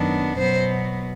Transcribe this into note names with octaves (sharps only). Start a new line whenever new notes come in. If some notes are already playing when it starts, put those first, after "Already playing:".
Already playing: F#2 D#3 F#3 B3 D4
B2 F#3 B3 C5